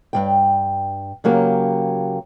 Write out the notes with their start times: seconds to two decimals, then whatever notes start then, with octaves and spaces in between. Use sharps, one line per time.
0.13 G2 F3 G5
1.24 C#3 F#3 A#3 G4